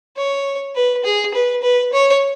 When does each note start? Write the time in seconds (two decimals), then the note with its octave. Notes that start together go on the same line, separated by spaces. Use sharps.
0.17 C#5
0.75 B4
1.04 G#4
1.34 B4
1.62 B4
1.92 C#5